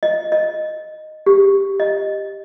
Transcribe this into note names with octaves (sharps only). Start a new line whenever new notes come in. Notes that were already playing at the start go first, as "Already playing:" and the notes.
D#5
D#5
G4
D#5